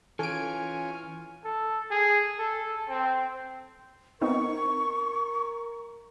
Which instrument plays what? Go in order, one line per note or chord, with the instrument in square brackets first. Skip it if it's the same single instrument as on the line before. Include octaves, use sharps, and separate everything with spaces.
[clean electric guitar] E3 [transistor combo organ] C#4 F4 [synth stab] A4 D7 [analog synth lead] G#5
[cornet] A4
G#4
A4
C4
[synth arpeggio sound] B3 C4 D#4 [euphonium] A#4 [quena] C#6